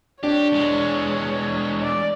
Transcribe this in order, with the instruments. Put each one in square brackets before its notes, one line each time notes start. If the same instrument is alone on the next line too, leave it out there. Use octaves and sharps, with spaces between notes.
[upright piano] D4 [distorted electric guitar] G4 [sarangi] C#5
[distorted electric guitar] E2 G#3
[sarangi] D5